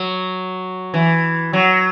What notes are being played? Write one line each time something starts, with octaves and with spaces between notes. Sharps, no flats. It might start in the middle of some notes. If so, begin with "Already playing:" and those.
Already playing: F#3
E3
F#3